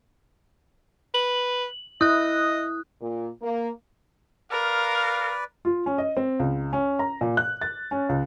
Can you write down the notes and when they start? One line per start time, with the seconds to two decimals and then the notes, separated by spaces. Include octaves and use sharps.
1.14 B4 F#7
2.01 E4 D#5 D#6 F#6
3.01 A#2
3.42 A#3
4.52 A#4 B4 D5 F5
5.65 F4
5.86 C#4
5.98 D#5
6.17 C4
6.39 C#2
6.73 C#4
6.99 A#5
7.21 A#2
7.37 F#6
7.61 A6
7.91 C#4
8.09 C#2